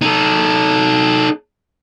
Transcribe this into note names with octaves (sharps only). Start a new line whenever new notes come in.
D#4 A4